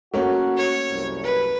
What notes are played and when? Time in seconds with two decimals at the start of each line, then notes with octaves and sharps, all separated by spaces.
0.14 A3 A#3 C#4 F#4
0.57 C#5
0.90 C2 F#2
1.24 B4